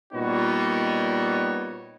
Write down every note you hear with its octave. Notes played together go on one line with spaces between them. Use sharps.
A#2 G3 B3 D#4 F#4 C#5